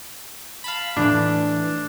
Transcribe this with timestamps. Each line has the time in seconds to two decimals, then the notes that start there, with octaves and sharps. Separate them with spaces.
0.64 F5 A5 B5
0.97 A2 E3 D4